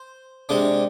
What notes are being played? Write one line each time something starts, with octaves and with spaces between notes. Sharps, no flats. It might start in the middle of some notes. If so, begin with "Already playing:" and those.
Already playing: C5
C3 G#3 D4